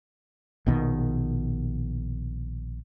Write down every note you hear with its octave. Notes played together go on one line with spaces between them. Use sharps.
A#1 B2 D3 D#3